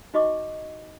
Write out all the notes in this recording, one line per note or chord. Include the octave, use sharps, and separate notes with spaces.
D#4 F#4 D#5 C#6 D6